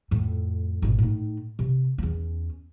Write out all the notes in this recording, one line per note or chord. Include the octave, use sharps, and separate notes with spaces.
F2 A2
G#1 B2
A2 D#4
C3
E2 C#4